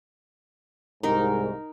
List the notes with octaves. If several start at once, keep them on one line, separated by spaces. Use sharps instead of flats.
C2 G#2 D#4 A#4